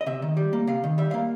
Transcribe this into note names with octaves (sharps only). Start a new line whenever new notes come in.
D#5
C3 E5
D#3
G3
A#3
C3 F5
D#3
G3 E5
A#3 F5